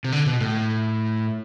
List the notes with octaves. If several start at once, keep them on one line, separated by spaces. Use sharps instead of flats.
C3
D3
B2
A2